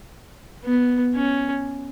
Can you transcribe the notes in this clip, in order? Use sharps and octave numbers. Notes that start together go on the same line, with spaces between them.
B3
C#4